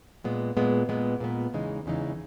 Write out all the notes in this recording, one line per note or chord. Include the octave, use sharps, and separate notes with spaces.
A#2 G#3 B3
A#2 G#3 B3
A#2 G#3 B3
A#2 G#3 B3
E2 C#3 E3 G#3 D#4
E2 C#3 E3 G#3 D#4